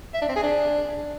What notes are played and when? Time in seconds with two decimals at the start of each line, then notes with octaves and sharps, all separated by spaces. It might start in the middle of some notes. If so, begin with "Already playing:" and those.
0.14 E5
0.21 D4
0.29 C4
0.36 G#4
0.43 D4